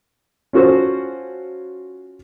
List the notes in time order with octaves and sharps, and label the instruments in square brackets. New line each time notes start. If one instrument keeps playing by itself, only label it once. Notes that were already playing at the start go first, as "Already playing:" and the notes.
[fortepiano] C#4 F4 F#4 A4 C5